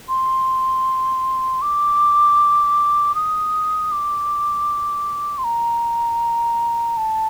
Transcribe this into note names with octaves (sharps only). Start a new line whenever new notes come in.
C6
D6
D#6
D6
C6
A#5
A5